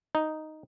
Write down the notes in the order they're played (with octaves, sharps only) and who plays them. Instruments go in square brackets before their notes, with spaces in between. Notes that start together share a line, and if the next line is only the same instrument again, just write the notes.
[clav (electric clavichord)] D#4